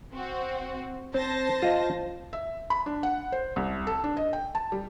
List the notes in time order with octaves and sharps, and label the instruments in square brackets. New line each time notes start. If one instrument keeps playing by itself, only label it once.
[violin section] C4 F#4
[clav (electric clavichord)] C4 [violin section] C5 A5 A#6
[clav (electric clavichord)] F4 D#5
[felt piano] E5
B5
D4
F#5
C5
C2
A4
D4
D#5
G5
A5
G3